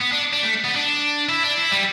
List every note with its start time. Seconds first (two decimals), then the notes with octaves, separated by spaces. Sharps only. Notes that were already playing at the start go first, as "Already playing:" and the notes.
0.01 B3
0.12 D4
0.33 D4
0.43 A3
0.65 B3
0.76 D4
1.29 E4
1.44 D4
1.58 E4
1.72 G3